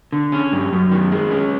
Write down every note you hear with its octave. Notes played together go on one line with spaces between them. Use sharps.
D3
C#4
G2
F#2
D#3
G#3
C#4